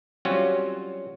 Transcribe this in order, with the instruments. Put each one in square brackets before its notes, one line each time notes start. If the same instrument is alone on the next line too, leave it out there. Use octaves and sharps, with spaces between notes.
[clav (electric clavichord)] F#3 G3 C4 C#4 F4 F#4